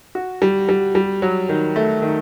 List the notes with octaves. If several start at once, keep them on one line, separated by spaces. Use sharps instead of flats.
F#4
G3
G3
G3
F#3
D#3
A3
D#3